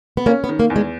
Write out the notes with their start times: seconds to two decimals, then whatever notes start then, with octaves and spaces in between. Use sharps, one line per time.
0.17 B3
0.26 A#3 C#4
0.44 B3
0.49 D#3
0.59 A#3
0.70 E2
0.76 G#3